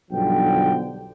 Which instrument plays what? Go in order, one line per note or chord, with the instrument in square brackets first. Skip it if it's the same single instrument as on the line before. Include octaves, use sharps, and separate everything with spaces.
[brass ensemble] B1 G2 D3 F3 G5